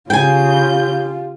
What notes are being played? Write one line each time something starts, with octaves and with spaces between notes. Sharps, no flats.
C#3 F4 G4 G5 G#5 G6